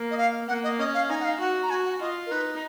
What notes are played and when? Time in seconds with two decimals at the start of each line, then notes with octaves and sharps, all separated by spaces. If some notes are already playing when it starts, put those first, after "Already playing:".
Already playing: A#3
0.11 D#5
0.18 F5
0.48 A#3 F#5
0.63 D#5
0.79 C#4 D#5
0.94 F5
1.10 D#4 G#5
1.20 F#5
1.24 F5
1.40 F#4 F#5
1.63 A#5
1.70 F#4 G#5
1.85 F#5
2.00 F4 D#5
2.26 A#4
2.31 D#4 B4